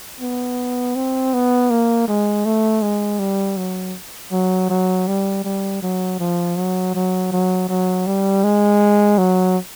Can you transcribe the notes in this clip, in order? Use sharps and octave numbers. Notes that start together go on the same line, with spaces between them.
B3
C4
B3
A#3
G#3
A3
G#3
G3
F#3
F#3
F#3
G3
G3
F#3
F3
F#3
F#3
F#3
F#3
G3
G#3
F#3